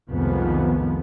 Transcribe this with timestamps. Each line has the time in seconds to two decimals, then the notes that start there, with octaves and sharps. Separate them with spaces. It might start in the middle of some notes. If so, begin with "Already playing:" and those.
0.10 C2 F2 D#3 F3 G#3 B3